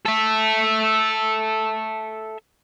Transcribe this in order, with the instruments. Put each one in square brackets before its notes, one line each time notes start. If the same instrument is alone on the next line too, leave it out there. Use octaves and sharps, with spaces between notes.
[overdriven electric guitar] A4 E5